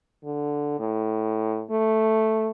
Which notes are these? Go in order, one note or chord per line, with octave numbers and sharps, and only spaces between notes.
D3
A2
A3